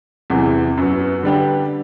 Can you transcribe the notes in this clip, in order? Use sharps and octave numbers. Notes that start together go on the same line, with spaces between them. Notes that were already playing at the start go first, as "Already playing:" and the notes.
E2 C3 E3
F#2 F#3 B3
D3 G3 D4 G4 B4